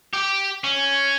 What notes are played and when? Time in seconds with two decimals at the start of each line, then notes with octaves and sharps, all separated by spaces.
0.13 G4
0.64 C#4